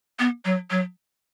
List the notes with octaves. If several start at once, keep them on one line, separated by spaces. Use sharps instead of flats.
B3
F#3
F#3